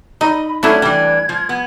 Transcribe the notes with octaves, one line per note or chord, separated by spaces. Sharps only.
D#4 D#5 B5
F#3 A3 C#4 D4 E4 G#6
E3 G3 D4
F3
B3